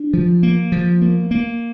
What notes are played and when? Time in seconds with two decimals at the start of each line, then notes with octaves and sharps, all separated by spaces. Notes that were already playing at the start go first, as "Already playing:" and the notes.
Already playing: D4
0.14 F3
0.43 A#3
0.72 F3
1.02 A#3
1.31 A#3